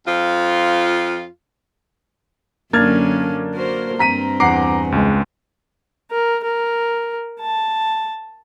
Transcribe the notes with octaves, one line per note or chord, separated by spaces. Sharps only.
F2 F3 F4
F#2 D3 A#3 C#4 D4 F6 G#6 A6
F#4 A#4 C5
G2 C4 A#5 B6 D#7
E2 F#5 A#5 D6 C7
C#2 G#3
A#4
A#4
A5